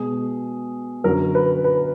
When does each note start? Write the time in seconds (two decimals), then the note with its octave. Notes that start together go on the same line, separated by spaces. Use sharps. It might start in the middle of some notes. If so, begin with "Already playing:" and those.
Already playing: B2 G#3 G#4
1.04 F#2 D3 F#3 A#4
1.35 B4
1.64 B4